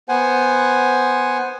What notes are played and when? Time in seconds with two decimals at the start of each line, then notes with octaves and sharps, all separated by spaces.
0.09 B3 C5 F#5 G#5